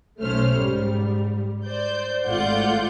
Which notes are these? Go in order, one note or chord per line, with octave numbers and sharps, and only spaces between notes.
B1 A3 C#4 C5 F6
G#2 G3
C5 D5 G6
G#1 A3 F4 D5 F#5 G6